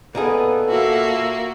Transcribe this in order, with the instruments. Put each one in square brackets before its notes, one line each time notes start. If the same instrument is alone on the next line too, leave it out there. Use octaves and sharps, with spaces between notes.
[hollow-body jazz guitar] A#2 D#4 G#4 [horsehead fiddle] B3 [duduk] A4
[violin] A#3 F#4 [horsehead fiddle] F4 E5